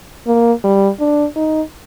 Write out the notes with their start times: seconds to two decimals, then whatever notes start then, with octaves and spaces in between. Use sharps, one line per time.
0.27 A#3
0.64 G3
1.00 D4
1.36 D#4